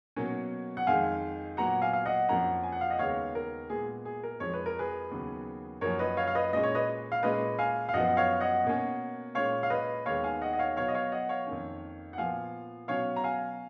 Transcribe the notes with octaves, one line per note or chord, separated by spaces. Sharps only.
B2 F#3 A#3 C#4
F#5
F2 D#3 G#3 F5 G#5
A#2 F#3 B3 F#5 A#5
F5 G#5
F5
D#5 F#5
F2 F3 A#3 C#4 F#5 A#5
G#5
F#5
F5
D#5 F#5
D#2 C#3 G#3 B3 C#5 F5
A#4
A#2 G#3 B3 G#4
G#4
A#4
F2 F3 G#3 C#5
B4
A#4
G#4 B4
D#2 C#3 F#3 B3
F#2 F3 A#3 C#4 A#4 C#5
B4 D#5
C#5 F5
F5
B4 D#5
A#2 G#3 C#4 D#5
C#5
B4 D#5
F5
A#2 G#3 C#4 B4 D#5
F5 G#5
F5
F#2 F3 B3 D#5 F#5
C#5 F5
D#5 F#5
B2 A#3 C#4
A#2 G#3 C#4 C#5 F5
F5
B4 D#5
D#2 D#3 G#3 B3 C#5 F5
F5 G#5
D#5 F#5
D#5
C#5 F5
B2 F#3 B3 C#5 F5
D#5
C#5 F5
D#5 F#5
C#5 F5
F2 D#3 A#3 C#4
F#5
A#2 F3 B3 F5 G#5
B2 F#3 C#4 C#5 F5
A#5
F5 G#5